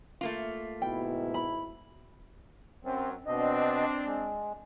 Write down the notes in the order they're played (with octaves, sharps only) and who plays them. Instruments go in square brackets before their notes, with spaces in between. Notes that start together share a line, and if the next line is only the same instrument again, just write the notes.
[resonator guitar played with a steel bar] A3 A#3 F4
[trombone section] G#1 G#2 E4 [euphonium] B2 [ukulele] G5
[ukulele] B5
[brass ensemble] F#2 [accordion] C4
[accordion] B2 D#5 [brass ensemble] C4 D4
[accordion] G#3